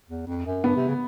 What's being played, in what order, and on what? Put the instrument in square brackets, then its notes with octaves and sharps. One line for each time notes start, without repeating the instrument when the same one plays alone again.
[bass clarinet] E2
F2
F#2
[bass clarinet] G2 [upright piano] B3
[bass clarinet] C3
C#3